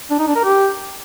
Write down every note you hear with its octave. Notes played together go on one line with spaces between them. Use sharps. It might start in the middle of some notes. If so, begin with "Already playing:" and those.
D4
D#4
D4
A#4
G4